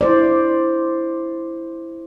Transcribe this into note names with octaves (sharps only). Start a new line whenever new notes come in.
E4 C5 D5